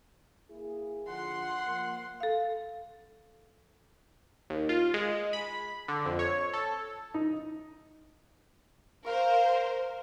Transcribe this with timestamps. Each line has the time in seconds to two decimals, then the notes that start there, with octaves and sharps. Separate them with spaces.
0.50 A#3 E4 G#4
1.08 D3 F3 F4 F#5 C6
1.65 F3 A#3
2.20 A4 F5
4.50 D#2
4.69 F4
4.94 G#3
5.33 B5
5.88 D3
6.05 F2
6.19 C#5
6.54 A4
7.14 D#4
9.05 A#4 C5 F5 C#6